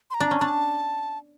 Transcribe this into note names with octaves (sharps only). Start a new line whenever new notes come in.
C6
A#5
D4
C#4
D4 A5 A#5